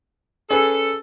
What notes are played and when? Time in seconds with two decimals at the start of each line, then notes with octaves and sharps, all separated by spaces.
0.51 C#4 G#4 A4 B4